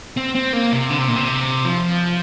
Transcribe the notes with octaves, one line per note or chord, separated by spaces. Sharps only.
C4
C4
A#3
C3
D3
C3
A#2
C3
F3